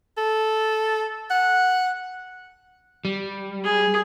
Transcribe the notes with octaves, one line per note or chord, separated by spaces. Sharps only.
A4
F#5
G3
G#4